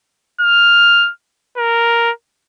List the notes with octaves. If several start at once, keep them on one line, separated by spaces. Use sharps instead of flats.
F6
A#4